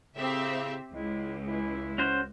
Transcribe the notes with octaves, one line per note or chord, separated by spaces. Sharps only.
A2 C#3 C4 G4 E5
C#2 G3 G#3 E4
E3 G#3 E4
C#4 F#4 C5